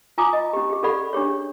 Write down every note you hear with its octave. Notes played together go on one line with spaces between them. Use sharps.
F4 G#5 A#5 D6 D#6
D#5
C#4 G4
G4 G#4
C#4 G4 A4 D5 F#5 B5
D4 G4 G#4 C#5